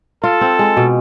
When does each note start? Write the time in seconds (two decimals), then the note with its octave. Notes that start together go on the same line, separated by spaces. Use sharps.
0.23 F4 A4
0.41 C4
0.59 G#3
0.77 B2